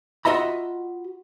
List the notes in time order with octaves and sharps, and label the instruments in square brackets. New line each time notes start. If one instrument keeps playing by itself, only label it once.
[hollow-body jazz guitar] F4 F#4 D#5 E5 A#5 B5